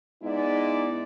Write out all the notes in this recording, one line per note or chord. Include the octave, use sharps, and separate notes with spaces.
G#2 G#3 B3 D#4 E4 D5